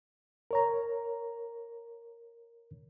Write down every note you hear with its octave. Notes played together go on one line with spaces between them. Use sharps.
A#4 C#5 A#5